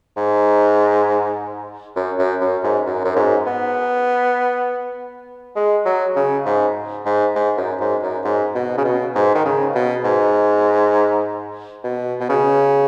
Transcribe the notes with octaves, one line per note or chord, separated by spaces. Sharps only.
G#2
F#2
F#2
F#2
G#2
F#2
F#2
G#2
B3
G#3
F#3
C#3
G#2
G#2
G#2
F#2
G#2
F#2
G#2
B2
C#3
B2
G#2
D#3
C#3
B2
G#2
B2
B2
C#3